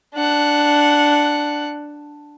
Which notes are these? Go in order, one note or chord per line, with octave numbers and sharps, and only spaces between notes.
D4 F#5